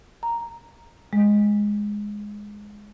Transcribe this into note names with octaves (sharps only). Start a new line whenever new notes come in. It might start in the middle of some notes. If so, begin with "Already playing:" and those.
A#5
G#3